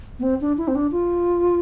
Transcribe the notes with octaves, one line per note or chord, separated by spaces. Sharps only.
B3
C4
D4
E4
C4
D4
F4